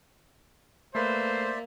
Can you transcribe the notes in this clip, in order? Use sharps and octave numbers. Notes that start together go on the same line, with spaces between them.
A3 A#3 B4 C5 D5 E5